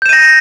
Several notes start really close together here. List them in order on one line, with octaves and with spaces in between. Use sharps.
G6 E7 D#7 A#6